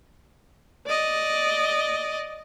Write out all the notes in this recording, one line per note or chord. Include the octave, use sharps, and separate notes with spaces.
D5 D#5